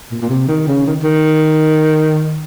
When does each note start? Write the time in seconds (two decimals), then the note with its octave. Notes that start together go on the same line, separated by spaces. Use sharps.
0.11 A#2
0.22 A#2
0.29 C3
0.48 D#3
0.67 C#3
0.86 D#3
1.03 D#3